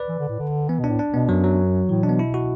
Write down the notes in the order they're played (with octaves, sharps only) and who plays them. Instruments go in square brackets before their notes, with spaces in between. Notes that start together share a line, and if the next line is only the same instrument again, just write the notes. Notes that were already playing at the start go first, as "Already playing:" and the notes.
Already playing: [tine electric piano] B4 D5
[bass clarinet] E3
D3
A2
D3
[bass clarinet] E3 [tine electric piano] B3
[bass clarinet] B2
[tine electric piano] D4
[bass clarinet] A2
[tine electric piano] D4
[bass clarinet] B2 [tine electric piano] B3
[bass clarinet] F#2 [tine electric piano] F#3
[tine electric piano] F#3
[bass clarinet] A2 [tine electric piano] E3
[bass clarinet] B2 [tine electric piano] D4
[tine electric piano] B3
E4
F#4